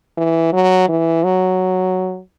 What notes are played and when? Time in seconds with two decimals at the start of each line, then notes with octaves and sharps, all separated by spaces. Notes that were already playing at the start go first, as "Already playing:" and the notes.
0.18 E3
0.53 F#3
0.89 E3
1.24 F#3